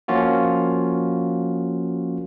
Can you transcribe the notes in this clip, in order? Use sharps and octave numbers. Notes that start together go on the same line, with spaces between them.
F3 A#3 C#4 F4 F#4